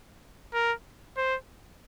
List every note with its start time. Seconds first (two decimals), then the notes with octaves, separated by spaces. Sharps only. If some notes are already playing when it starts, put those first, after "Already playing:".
0.54 A#4
1.17 C5